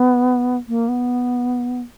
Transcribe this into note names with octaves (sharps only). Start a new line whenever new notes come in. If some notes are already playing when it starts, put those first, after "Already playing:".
Already playing: B3
A#3
B3